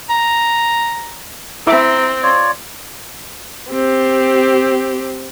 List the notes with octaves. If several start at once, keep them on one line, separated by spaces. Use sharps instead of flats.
A#5
C4 E4 E5 A#5 D6
F4 C#5 D5
C4 G4